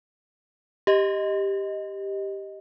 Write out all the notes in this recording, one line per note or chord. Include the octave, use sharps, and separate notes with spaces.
G4 D#5